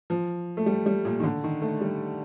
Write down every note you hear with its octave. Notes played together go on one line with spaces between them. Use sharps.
F3
A3
G3
G3
A#2
D#3
D3
D#3
A3
G3